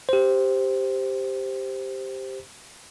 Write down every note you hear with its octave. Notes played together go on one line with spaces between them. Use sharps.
G4 C5